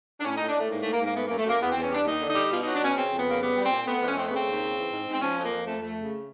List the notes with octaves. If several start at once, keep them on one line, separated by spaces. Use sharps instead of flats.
D4
A2 C#4
A2 D#4
D4
A2 A3
G#2 A#3
G#2 A3
A#3
G#2
A#3
A3 B3
F#2 A#3
A3
F#2 A#3
E2 B3
E2 C4
C#4
G3 D4
D#2 D#4
D3
D#4
G3
B2 F4
F#3 D#4
D4
B2 C#4
C#3 C4
F2
B3
C#3 A#3
G3 B3
G3
C4
A#2
A3 B3
F2
C#4
A3 C4
B3
C#3 C4
D#2
C#3
E3
G#2
G#2
C4
F3 C#4
F2
A#3
F3
F2 A3
A3
C#3